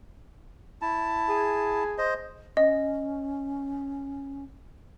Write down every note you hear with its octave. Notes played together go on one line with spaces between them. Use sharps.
E4 A5
G#4
C5 D#5
C#4 D#5